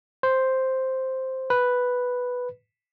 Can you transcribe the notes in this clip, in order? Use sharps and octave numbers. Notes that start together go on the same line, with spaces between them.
C5
B4